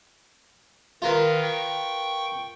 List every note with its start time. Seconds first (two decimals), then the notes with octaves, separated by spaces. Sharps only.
1.02 D#3 F4 A#4 B4
1.42 G5 C#6